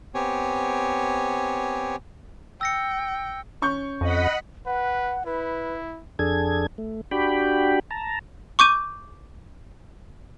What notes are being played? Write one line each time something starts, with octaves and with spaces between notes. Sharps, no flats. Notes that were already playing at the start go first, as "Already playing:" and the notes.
B3 C4 G4 C#5 G#5
G5 E6 A#6 C#7
C#4 C#6 G6
F2 D#5 F#5 B5
B4 F#5
E4 B4
F2 D4 G#4 A4 G#6
A3
D4 F#4 G4 G5 B5
A5 A#5
C#6 D6 G6 D#7